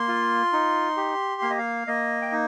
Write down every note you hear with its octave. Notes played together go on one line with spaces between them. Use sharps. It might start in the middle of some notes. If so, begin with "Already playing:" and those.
Already playing: A#3 C6
F4
D#4
G4
A#3 F5
D#5
F5
A#3 D#5
G5
D#4